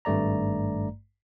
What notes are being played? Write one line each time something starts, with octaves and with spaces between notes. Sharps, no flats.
G#1 G2 A3 D5 A#5